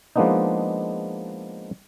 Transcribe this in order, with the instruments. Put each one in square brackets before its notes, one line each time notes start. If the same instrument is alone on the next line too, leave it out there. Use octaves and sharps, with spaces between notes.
[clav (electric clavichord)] F3 G#3 A#3 B3 D4 D#4